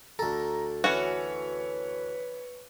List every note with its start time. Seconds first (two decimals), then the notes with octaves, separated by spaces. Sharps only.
0.19 D2 A4 A#5
0.84 E3 C#4 F#4 B4 C#5